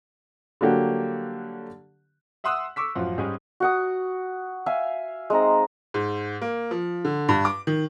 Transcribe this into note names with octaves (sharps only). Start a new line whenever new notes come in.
D3 F#3 G3 A#3 F#4 G4
E5 F#5 C6 D#6 E6 F#6
C#6 D6 E6 B6
A1 F#2 F3 F4 F#5
G#2 G3 G#3 C#4 G#4
F#4 F#5 D#6
E5 F5 G#5
G#3 C4 D#4 A#5
G#2
A#3
F3
D3
G2
D6
D#3